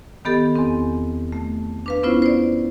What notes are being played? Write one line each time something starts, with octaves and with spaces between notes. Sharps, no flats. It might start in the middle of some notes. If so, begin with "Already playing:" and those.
D#3 B3 G4 A4
E2 C4
A3
D4 B4 F5
B3 C#4 E4 F4 C5
C5 D5